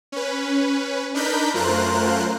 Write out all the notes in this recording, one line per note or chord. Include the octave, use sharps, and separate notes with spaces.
C#4 B4
D4 D#4 A#4 B4 B5 G6
F#2 A3 F4 A#4 C5 F#6